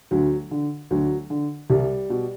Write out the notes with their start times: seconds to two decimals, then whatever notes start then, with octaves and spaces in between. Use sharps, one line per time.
0.11 D2 F#3
0.51 D3
0.91 D2 F#3
1.30 D3
1.70 C2 G3
2.10 B2